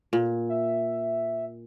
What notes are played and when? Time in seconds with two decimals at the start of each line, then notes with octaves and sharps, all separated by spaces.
0.13 A#2
0.49 E5